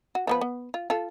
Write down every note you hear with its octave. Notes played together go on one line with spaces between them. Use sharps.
F#4
F3 B3 B4
B3
F4
F4 A4